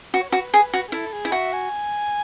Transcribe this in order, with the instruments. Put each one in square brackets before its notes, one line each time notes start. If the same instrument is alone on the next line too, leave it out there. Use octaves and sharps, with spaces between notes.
[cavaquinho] F#4 [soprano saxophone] B4
[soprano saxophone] C#5
[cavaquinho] F#4 [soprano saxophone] B4
[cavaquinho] G#4
F#4
[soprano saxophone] G#4
[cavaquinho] E4 [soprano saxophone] A4
[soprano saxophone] G#4
[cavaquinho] E4
[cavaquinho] F#4 [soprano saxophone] E5
[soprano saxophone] G#5